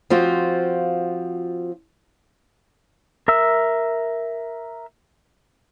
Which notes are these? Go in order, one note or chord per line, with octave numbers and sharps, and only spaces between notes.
F3 C4 F4 F#4
A#4 E5 E6